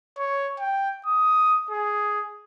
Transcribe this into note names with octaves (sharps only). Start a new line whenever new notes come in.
C#5
G5
D#6
G#4